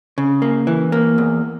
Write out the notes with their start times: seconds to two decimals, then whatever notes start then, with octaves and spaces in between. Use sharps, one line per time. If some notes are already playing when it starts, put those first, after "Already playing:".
0.18 C#3
0.42 A#3
0.67 E3
0.92 A#3
1.18 E2